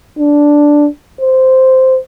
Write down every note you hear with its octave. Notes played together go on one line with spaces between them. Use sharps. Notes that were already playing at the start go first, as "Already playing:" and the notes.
D4
C5